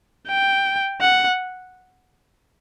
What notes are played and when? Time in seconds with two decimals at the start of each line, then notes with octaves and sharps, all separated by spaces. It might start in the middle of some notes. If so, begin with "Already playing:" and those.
0.27 G5
1.01 F#5